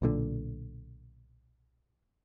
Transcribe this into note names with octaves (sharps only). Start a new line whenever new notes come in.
B1 A#2 D3